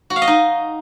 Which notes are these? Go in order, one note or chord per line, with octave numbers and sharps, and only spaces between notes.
F#4
F5
D#5
D#4